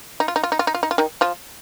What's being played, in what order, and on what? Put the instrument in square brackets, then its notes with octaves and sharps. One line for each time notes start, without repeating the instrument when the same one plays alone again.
[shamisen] D#4
F4
D#4
F4
D#4
F4
D#4
F4
D#4
F4
D#3 D#4
F3 F4